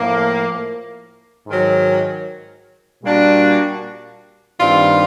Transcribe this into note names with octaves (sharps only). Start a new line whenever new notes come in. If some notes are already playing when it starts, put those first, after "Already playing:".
Already playing: A2 F3 A#3
G#2 D#3 F#3
A#2 G3 A#3 D4 F#4
G2 D#3 G3 C4 F4